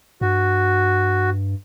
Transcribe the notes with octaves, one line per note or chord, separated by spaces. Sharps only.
G2 F#4